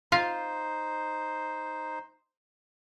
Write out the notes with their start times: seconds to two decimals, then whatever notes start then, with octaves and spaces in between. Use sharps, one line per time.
0.12 D#4 F4 C5 F5